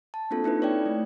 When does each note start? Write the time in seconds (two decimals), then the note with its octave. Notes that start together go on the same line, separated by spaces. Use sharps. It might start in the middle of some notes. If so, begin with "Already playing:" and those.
0.14 A5
0.31 A#3 C4 D4 F4 A4
0.44 D#4 E4 A4 B4
0.62 C#5 D5 G5
0.86 A3